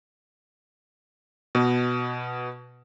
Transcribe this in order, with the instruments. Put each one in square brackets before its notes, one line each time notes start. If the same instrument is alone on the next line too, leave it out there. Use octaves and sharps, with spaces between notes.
[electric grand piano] B2 B3